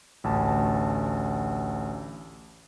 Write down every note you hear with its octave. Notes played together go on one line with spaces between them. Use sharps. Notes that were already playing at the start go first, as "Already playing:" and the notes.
A1 D2 A5